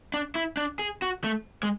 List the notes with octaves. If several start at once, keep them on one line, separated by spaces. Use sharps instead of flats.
D4
E4
D4
G#4
F#4
A3
G#3